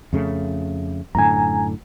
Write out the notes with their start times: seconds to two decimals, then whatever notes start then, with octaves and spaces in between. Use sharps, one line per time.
0.13 F2 C#3 A3
1.15 F#2 A2 D3 G#5 A#5